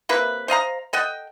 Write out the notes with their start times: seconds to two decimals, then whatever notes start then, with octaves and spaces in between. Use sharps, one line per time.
0.09 C3 A#3 B4
0.48 C5 D#5 F5 A#5
0.93 A4 D#5 F#5 G5